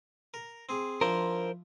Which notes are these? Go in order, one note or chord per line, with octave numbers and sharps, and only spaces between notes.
A#4
C4 G#4
F3 D4 E4 A#4 C5